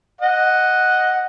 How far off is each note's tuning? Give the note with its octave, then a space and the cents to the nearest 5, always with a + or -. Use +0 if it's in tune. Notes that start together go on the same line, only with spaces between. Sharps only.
D#5 +0 F#5 +0